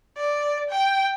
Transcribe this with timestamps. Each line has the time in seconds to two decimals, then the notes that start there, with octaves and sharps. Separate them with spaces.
0.17 D5
0.70 G5